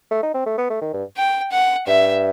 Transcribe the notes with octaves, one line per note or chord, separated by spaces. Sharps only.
A3
D#4
C4
A3
B3
A3
D#3
G2
G5
F#5
G2 E5